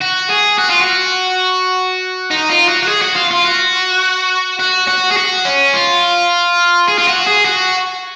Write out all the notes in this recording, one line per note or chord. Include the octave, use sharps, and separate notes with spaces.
F#4
G#4
F#4
F4
F#4
D#4
F4
F#4
F#4
G#4
F#4
F4
F4
F#4
F#4
F#4
G#4
F#4
C#4
F4
G#4
F4
F#4
G#4
F#4